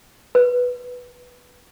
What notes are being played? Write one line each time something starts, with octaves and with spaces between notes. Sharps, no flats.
B4